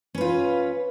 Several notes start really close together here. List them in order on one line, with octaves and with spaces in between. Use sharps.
C#4 B4 F4